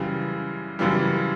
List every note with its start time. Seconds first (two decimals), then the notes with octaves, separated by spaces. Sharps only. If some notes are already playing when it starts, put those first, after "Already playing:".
Already playing: F#2 C#3 E3 G3
0.79 F#2 C#3 E3 G3